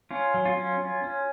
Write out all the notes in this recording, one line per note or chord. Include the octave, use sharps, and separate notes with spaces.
C#4 F4
F#3
F4
C#4
C#4
C#4